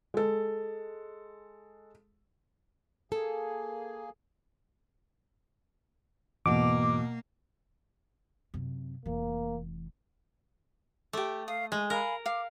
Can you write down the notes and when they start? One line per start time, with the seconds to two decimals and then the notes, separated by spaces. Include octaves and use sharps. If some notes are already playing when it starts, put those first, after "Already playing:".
0.14 G#3 A4
3.12 A#3 G#4 A4
6.46 E2 G#2 B2 E3 A#3 D6
8.54 F#2 C3
9.05 F1 E3 A#3
11.13 A3 G4 D6
11.48 F5 D#6
11.72 G#3 G#5
11.90 A#4 F5 G#5 B5
12.26 F5 D6